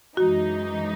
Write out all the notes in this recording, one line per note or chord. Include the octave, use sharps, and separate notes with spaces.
F#2 E3 G#3 D#4 F#4